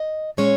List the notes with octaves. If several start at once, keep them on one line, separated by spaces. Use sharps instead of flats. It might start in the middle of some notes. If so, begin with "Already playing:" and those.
Already playing: D#5
A#2 G#3 C#4 C#5